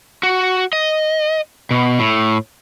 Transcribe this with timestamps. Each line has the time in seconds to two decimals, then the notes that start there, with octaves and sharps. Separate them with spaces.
0.23 F#4
0.73 D#5
1.71 B2
1.99 A2